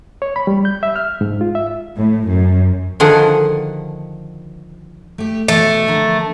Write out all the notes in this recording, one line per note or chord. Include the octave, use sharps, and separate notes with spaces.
C#5
B5
G3
G6
E5
F6
G#2
F4
E5
A2
F#2
D3 D#3 F3 G#4 F#5
A3 G4
B2 E3 A3
D3 F3 A#4